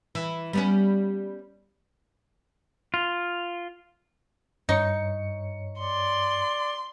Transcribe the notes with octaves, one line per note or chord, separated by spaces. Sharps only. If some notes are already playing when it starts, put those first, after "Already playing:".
E3
G3 B3 C#4
F4
G2 D#4 C#5 C#7
D5 C6